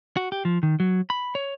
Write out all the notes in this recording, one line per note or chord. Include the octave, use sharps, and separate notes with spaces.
F#4
G4
F3
D#3
F#3
B5
C#5